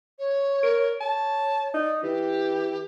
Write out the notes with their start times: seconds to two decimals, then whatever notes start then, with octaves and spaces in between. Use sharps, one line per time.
0.19 C#5
0.63 A#4
1.00 C#5 A5
1.73 D#4 D5
2.03 E3 G4